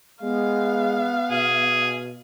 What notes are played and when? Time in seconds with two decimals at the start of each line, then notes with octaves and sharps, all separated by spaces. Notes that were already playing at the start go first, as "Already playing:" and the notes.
0.22 G#3 B3 F5
1.31 B2 G#4